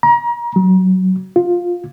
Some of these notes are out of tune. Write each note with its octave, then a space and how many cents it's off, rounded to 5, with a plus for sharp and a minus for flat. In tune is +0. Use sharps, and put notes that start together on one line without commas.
A#5 +35
F#3 +10
F4 +10